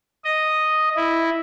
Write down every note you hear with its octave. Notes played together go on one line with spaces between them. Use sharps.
D#5
E4